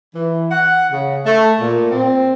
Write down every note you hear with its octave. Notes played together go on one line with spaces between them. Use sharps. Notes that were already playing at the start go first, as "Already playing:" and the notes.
E3
F#5
C#3
A3
A#2
C4